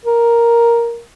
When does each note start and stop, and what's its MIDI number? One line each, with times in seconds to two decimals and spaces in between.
0.05 1.01 70